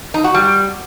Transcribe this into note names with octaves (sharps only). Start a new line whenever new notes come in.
D#4
F#4
G3